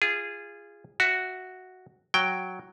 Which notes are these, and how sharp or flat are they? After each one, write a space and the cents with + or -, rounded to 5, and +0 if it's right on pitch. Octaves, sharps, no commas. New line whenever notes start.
F4 -20 G#4 -15
F#4 +0 E5 +0
F#3 +0 G5 +0